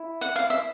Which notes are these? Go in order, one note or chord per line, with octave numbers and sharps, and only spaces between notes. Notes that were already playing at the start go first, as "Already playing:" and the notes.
Already playing: E4
F#5
F5
E5